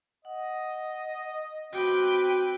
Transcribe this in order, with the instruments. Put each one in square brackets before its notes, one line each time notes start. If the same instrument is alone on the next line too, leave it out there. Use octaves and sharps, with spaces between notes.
[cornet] D#5 [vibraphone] F#5
[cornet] C4 [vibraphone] F#4 D6 [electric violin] B4 G5